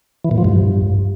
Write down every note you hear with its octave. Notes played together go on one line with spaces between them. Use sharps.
E3
A#2
F3
G2